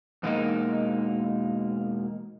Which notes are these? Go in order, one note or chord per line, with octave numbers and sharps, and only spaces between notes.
E2 B2 G#3 A#3 D#4